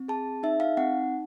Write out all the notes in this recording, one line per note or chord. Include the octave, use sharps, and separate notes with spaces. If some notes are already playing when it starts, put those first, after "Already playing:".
Already playing: C4
G#4 A5
D#4 E5
F5
C4 F#5